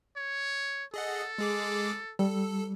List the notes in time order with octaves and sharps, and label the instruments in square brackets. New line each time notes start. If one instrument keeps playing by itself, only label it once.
[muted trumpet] C#5
[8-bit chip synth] G#4 D#5 F#5 [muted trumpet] A4
[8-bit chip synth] G#3 G#4 D6
[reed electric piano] G3 [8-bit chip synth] A4